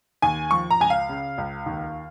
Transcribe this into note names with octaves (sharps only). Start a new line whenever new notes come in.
D#2 G#5
F3 C#6
A#5
C#2 G#5
F5
C#3
C#2
D#2